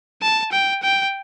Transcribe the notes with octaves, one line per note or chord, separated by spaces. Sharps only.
A5
G5
G5